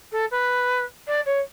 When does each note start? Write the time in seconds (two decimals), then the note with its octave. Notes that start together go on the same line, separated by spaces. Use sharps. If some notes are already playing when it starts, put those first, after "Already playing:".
0.11 A4
0.31 B4
1.07 D5
1.26 C#5